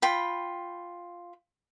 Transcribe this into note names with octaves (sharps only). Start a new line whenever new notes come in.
F4 G5 B5